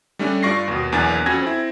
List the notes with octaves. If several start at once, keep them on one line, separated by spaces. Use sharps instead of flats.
G3 A3 C#4 D4
G2 F4 D5 C#6 A#6 C7
D#2 B2
B1 E2 A#3 D4 G#5 A6
F2 C#4 F#4 G#5 G#6 A#6
C4 E4